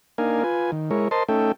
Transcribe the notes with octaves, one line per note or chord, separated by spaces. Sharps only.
A#3 D4 D#4 A#4 F5 G#5
F4 B4 G#5
D#3
G#3 E4 A#4 C#5
A#4 C5 D#5 A5 C6
A3 C#4 D#4 A4 E5 G5